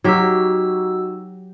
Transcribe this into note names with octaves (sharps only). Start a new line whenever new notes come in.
F#3 D#4 F#4 G4 E6